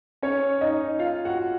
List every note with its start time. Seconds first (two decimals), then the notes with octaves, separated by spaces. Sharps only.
0.22 C#4 C#5
0.61 D#4 D#5
0.99 F4 F5
1.25 F#4 F#5